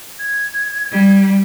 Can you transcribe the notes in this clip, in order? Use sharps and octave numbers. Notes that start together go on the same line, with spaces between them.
G#6
G3